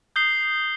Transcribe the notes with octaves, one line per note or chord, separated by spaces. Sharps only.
D#6 G6 C7 G7